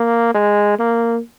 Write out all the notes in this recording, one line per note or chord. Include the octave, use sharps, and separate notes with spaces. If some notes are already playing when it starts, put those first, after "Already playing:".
Already playing: A#3
G#3
A#3